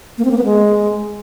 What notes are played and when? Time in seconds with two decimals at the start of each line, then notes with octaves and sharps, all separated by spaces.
0.18 A#3
0.25 C4
0.31 A#3
0.38 B3
0.44 G#3